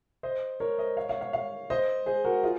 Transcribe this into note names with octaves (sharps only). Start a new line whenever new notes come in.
C5 D#5
A#4 C#5
C5 D#5
C#5 F5
C#5 F5
C#5 F5
C#5 F5
C5 D#5
G#4 C5
F#4 A#4
F4 G#4